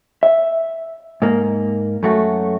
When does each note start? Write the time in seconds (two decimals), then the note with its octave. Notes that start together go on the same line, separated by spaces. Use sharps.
0.23 E5
1.22 G#2 A#3
2.03 F#2 A3 F#4